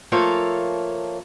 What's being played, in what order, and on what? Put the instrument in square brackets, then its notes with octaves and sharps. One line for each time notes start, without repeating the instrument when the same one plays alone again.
[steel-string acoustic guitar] F3 A3 A#3 A4 C#5 F5